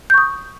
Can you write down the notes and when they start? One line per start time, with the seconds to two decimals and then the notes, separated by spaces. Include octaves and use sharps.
0.10 G6
0.14 C#6
0.18 D#6